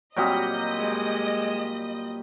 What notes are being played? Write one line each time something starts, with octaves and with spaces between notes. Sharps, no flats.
A#2 F#3 G3 C4 G4 D#5 D#6
G#3